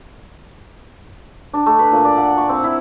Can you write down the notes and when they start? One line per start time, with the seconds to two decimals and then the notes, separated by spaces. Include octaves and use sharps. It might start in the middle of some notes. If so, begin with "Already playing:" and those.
1.54 D4
1.66 A3
1.79 B4
1.92 A#2
2.05 D5
2.17 F#5
2.37 C#6
2.49 C4
2.64 E4